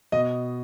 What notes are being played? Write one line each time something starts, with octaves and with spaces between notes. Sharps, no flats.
B2 D#5